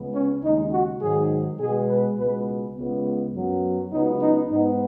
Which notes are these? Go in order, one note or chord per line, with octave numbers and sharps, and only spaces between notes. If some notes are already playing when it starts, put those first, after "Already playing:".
Already playing: C#2 C#3 G#3 B3
C#4
D#2 C#3 G#3 D#4
F#4
G#2 D#3 F#3 G#4
B2 G#3 B3 G#4
B4
C#2 B2 G#3 B3 B4
C#2 C#3 B3
F#2 F#3 B3
C#2 C#3 F#3 B3 D#4
D#4
G#2 G#3 B3 D#4